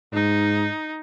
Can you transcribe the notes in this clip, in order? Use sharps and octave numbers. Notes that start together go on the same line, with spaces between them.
G#2 D#4